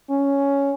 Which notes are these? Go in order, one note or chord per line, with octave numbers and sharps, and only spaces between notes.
C#4